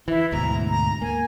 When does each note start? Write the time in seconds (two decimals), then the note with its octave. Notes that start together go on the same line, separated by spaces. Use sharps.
0.08 E3 E4
0.32 D2 G#2 B2 A#5
0.69 A#5
1.02 A#3 G#5